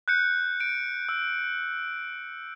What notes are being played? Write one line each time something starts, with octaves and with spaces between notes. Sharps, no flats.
F#6 G6 C#7
D7
E6